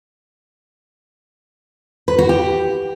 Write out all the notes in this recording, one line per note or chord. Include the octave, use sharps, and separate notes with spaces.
B4
F#4
G4